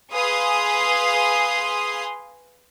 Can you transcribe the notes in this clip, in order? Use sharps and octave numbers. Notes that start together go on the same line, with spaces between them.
G#4 B4 F5 G#5 C6 D#6